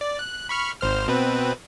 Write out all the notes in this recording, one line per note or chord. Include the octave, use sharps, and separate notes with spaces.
D5
F#6
B5 C#6 F6
G#1 C5 F6
B2 C4 B4